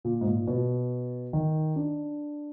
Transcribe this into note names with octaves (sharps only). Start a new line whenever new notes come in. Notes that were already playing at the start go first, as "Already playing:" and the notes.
A#2
G#2
A#2
B2
D#3
D4